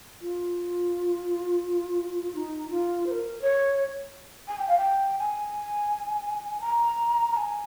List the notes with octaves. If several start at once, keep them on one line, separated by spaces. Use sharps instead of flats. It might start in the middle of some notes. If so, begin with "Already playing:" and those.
F4
D#4
F4
C5
A#4
C#5
G#5
G5
F5
G5
G#5
A#5
A#5
G#5